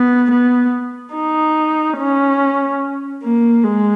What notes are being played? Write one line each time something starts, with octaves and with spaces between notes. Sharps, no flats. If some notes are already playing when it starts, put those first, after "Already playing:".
Already playing: B3
B3
D#4
C#4
A#3
G#3